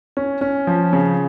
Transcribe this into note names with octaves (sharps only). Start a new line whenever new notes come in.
C#4
C#4
F3
C#3